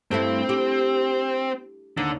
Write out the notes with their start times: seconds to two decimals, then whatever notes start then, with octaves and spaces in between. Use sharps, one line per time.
0.11 G2 A3 C4 E4
0.49 G4
1.97 D#2 D3